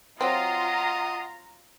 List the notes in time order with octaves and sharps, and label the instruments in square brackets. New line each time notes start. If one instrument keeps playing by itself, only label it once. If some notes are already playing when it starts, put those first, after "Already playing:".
[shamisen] F#3 C4 [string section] F4 A#5 [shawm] D#5 [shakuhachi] F#5